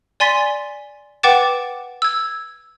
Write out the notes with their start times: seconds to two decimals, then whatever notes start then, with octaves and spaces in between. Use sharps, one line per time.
0.20 D5 G#5 C6 A6 B6
1.23 B4 F#5 G5 D6 A6 E7
2.02 E6 G#6